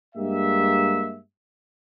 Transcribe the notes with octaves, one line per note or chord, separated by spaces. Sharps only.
G2 G#3 A#3 G4 E5